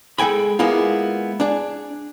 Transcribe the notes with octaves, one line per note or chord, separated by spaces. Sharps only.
G#3 A4 G5 G#5 B5
G#3 A#3 B3 E4 F4
D4 G#4